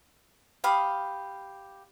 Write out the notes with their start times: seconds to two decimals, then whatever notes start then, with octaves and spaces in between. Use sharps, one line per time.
0.64 G4 F5 B5 D#6